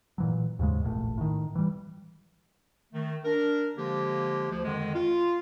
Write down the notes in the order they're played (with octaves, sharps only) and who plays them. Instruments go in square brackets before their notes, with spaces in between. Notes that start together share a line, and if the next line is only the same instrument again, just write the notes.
[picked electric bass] A#2 E3 F#3
D#2 G#2 C#3 G#3
E1 A#1 A2
A2 D#3
E3 G3
[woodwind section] D#3 A3
D4 A#4
D3 F3 G#3 A#3 G4
D2 F3
F2 D3 D#3 G#3
F4